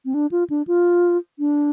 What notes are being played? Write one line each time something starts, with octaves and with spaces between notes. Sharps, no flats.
C4
D4
F4
D4
F4
D4